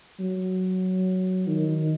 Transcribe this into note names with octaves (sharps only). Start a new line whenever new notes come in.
F#3
D#3